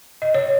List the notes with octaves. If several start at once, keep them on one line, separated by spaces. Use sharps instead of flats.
D#5
C#5